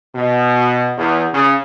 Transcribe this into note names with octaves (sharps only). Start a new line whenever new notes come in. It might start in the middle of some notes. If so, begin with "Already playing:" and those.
B2
E2
C#3